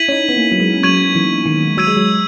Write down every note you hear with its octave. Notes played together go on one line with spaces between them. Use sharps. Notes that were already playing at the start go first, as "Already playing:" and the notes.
Already playing: E4 G#6 B6 D#7 F#7
C#4
D#4
B3
A#3
F#3
G#3
F#3 C#6 G#6 D#7 F#7
E3
D#3
F#3 E6 G#6 D#7
G#3
F#3